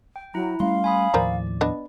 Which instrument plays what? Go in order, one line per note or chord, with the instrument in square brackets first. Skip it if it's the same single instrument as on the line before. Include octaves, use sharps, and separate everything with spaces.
[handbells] G5
[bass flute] F#3 [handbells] E4 A#5
[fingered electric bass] G3 A3 C#4 [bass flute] F5 [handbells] C6
[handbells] G#5 B5 D#6
[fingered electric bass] D#2 A2 F3 [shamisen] A#4 C5 A#5 [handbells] D5
[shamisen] B3 D4 D#5